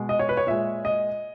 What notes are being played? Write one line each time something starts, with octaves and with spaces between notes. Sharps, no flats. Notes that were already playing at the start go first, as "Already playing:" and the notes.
Already playing: B2 G#3
D#5
C#5
B4
C#5
A#2 G#3 E5
D#5